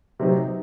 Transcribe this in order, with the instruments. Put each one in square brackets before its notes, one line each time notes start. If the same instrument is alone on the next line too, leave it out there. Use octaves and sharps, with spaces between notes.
[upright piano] C3 F#3 C4 D#4